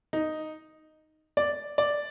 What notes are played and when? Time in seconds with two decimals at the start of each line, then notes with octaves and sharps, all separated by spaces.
0.13 D#4
1.37 D5
1.78 D5